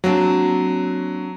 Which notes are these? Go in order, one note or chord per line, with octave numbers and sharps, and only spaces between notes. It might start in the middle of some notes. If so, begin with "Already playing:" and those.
F#3 A#3 C4 D4